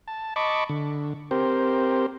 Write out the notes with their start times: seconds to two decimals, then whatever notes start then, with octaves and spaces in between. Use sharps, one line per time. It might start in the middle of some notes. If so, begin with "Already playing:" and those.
0.08 A5
0.36 D#5 A5 B5 C#6 D6
0.69 D3
1.31 C4 G4 A#4 C5